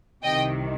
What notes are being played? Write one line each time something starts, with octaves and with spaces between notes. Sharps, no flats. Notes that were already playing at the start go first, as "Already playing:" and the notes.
C2 C3 D#3 D#5 G5